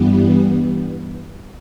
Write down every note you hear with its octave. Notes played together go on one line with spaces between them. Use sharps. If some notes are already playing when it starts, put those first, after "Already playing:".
Already playing: G2 E3 G3 B3